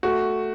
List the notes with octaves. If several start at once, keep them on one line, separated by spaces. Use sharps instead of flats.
A3 F#4